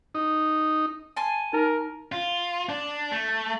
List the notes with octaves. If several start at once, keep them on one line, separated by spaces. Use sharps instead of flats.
D#4
G#5 A5 C6
D#4 A#4
F4
D4
A3